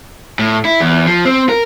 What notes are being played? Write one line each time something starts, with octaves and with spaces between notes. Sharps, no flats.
A2
E4
E2
F3
C4
A#4